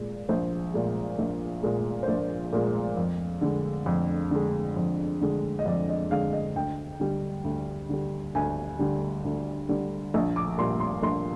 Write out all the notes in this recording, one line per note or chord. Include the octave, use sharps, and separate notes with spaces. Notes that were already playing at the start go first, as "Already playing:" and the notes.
Already playing: A#2 G#3 D5
A#1 C5
A#2 G#3
A#1
A#2 G#3
C5
A#1 D5
A#2 G#3
F2
D3 G#3
F2
D3 G#3
F2
D3 G#3
D#5
F2 D5
D#5
D3 G#3 F5
D#5
D2 G5
D3 G3
D2
D3 G3
D2 G#5
D3 G3
D2
D3 G3
A#1
D6
A#2 G3 C6
C6
A#1 C6